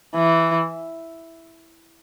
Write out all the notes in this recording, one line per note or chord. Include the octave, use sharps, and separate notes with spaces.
E3